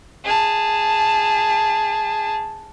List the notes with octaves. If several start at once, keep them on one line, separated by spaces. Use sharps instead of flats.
G#4 A5